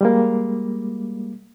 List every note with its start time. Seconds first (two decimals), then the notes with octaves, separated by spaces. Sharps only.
0.01 G3 G#3 A#3